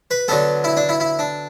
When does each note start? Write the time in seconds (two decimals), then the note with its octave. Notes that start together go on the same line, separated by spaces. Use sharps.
0.11 B4
0.28 D3 F#3 B3 A4
0.64 E4
0.77 D4
0.89 E4
1.00 E4
1.19 D4